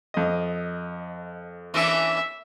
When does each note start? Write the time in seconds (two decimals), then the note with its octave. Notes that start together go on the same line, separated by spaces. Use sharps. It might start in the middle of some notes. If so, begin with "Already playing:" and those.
0.14 F2 D#5
1.74 E3 C#4 D4 E5